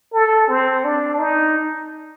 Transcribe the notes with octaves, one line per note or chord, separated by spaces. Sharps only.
A4
C4
D4
D#4